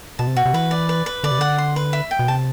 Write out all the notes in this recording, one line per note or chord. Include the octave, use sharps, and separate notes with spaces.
B2 A5
C3
B2 F#4
C3
E3 B4
D5
B4
B4
D3 D5
C3
D3 F#5
C6
B4
E5
G5
B2
C3 A5